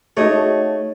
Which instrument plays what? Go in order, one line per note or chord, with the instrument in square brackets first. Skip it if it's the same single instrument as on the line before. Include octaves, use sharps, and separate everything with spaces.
[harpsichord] A3 [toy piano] D#4 G#4 [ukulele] F#4 D#5 [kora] C#5